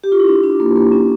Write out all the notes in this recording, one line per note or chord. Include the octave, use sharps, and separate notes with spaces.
G4
F4
E4
D4
D4
A#3
A#3
C#4